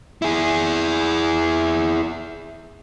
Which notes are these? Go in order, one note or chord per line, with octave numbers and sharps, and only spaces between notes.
E4 G#4